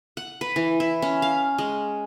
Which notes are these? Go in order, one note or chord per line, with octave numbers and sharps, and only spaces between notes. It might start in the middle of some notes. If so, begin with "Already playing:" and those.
F#5
B4
E3
E4
C#4
F5
G#3